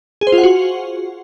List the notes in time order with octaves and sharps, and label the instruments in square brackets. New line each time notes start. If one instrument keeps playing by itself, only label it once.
[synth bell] G#4
C5
F4
F#5
F#4